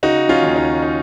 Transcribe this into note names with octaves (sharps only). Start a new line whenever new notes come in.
C#3 D#4 F#4
C#4 F4
D#2
D#4
D#4